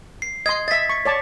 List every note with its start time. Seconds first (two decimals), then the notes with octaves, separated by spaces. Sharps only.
0.22 C7
0.46 D#5 C6 G#6
0.68 D#5 E5 A6 B6
0.89 C#6
1.05 C#5 D5 A5